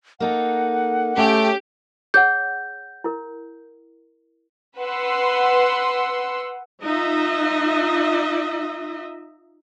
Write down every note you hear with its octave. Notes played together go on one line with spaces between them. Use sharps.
A#3 D#4 A4 F#5
A3 C#4 G4 G#4
G#4 C#5 F#5 G6
E4 A#4
B4 F#5 C6 E6
D#4 F4 D#5 E5